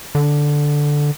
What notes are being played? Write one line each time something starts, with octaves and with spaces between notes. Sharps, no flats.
D3